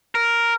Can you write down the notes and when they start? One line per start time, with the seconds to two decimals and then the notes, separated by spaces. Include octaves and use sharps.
0.15 A#4